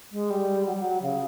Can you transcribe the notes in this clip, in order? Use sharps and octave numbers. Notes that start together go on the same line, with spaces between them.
G#3
G3
F#3
G3
F#3
C#3